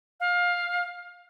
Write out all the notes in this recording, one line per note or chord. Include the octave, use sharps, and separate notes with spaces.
F5